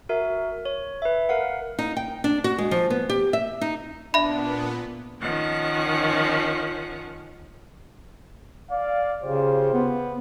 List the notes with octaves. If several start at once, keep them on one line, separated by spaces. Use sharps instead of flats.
F#4 A#4 E5
C#5
B4 E5
A#4 F5 F#5
D#4
G5
D4
F#4
G#3
F3
B3
G4
E5
D#4
A#2 B3 D4 E5 B5
D#3 F3 C#4 F#5
D5 F5
C#3 F4 G4 C5
B3